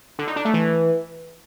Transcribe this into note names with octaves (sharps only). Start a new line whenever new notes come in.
D3
D#4
D4
A3
E3